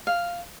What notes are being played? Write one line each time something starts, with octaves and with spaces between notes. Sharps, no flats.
F5